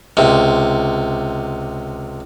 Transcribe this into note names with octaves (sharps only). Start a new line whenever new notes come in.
C#2 C3